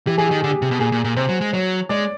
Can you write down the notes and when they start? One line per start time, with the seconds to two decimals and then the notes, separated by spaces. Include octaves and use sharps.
0.07 E3 G4
0.18 E3 G#4
0.29 D#3 G4
0.41 D3 G#4
0.51 G4
0.62 C3
0.71 B2
0.80 A#2 G#4
0.92 A#2
1.04 A#2
1.16 C3 C5
1.29 F#3
1.41 G#3
1.53 F#3 C#5
1.89 G#3 D5